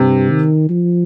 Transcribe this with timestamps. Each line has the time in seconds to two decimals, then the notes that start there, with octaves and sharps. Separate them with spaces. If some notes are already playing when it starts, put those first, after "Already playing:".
Already playing: G2 C3
0.30 D#3
0.69 F3